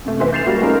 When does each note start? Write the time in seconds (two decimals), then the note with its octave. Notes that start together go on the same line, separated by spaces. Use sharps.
0.04 F#2 C3 A3
0.20 E3 C5 E5
0.32 G6 A6 C7 E7 F7
0.46 G3 G#3 A#3 F#4
0.61 G#3 A3 C#4 D#4 F4 A#4